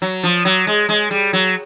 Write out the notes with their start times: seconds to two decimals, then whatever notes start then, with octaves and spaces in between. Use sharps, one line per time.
0.02 F#3
0.24 F3
0.45 F#3
0.67 G#3
0.89 G#3
1.11 G3
1.33 F#3